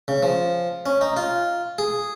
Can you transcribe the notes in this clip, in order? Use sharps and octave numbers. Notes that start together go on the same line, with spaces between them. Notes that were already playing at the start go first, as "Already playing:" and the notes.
C#3
F3
C#4
D#4
F4
G#4